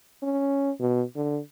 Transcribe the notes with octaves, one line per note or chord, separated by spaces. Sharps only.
C#4
B2
D3